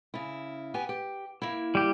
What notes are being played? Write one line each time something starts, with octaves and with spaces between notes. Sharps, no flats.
C#3 E4
B3 G4 G#5
G4
A#3 E4
G3 G4